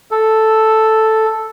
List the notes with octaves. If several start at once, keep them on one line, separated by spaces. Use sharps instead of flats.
A4